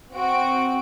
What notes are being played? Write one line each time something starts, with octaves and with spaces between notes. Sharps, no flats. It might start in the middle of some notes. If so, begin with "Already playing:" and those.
C4 F#4 D7